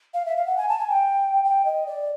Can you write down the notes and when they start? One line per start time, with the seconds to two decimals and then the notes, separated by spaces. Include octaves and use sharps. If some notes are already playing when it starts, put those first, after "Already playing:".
0.14 F5
0.26 E5
0.37 F5
0.46 F#5
0.57 G#5
0.69 A5
0.79 G#5
0.89 G5
1.44 G5
1.65 D#5
1.87 D5